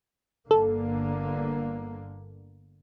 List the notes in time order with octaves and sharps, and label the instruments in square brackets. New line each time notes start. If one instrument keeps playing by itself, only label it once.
[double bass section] G1 D3 A#3 [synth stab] A4